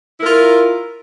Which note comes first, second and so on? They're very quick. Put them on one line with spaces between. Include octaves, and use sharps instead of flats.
E4 A#4 F4